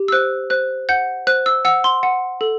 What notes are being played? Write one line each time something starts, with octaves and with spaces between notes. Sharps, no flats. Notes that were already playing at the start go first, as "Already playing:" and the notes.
Already playing: G4
E6
C5 F#6
C5 F#6
F#5 G6
C5 F#6
E6
F#5 E6
C6
F#5
A4